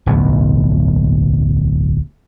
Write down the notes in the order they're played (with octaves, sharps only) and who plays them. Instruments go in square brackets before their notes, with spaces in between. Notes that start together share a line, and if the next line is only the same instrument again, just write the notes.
[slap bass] D1 B1 E2